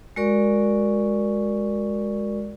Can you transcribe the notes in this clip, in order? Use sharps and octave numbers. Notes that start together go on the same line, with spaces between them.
G#3 F#4 A#4 D5 C#6